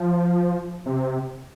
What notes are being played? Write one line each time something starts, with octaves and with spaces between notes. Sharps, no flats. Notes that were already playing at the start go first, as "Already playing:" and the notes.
Already playing: F3
C3